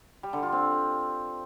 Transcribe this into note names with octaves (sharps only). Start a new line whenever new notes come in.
G3
D3
F4
C4